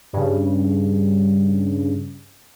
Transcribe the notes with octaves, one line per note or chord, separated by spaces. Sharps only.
G2 C#3